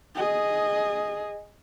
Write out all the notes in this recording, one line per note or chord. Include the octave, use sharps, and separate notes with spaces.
G#4 D#5